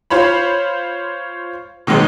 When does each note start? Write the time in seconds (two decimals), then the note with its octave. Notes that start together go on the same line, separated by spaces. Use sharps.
0.10 F4 C5 C#5 B5
1.87 B2 D#3 F#3 G#3 B3